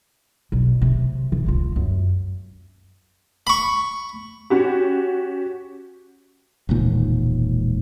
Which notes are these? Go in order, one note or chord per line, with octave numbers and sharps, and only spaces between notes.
B1
C3
E3
C#2 F4
F#2
B5 C#6
C#4 F#4 G4
E1 C#2 A#2 D#3